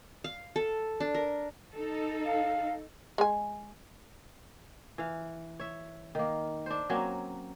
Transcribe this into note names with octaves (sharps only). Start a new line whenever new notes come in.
F5
A4
D4
A#4
D#4 A4
F5
G#3 G#5
E3 F5
C#5 E5
D#3 A#3
D4 C5
F#3 A#3 C4 C#4